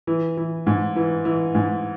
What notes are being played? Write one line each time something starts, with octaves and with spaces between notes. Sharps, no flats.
E3
E3
G#2
E3
E3
G#2